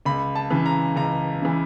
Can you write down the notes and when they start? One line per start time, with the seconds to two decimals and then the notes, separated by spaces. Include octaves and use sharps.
0.05 C#2 B5
0.35 A5
0.50 C#3 E3
0.66 A#5
0.96 C#2 A#5
1.42 C#3 E3